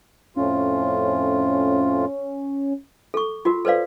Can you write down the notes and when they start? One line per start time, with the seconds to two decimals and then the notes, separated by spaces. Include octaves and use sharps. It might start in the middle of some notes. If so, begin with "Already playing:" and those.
0.36 F2 A2 C#4 F4
3.14 A4 C#6
3.45 F4 F#4 A#4
3.65 A4 B4 C5 D5 F5